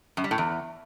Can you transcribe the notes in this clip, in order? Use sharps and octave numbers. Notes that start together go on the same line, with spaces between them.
F#2
G3
A2
E2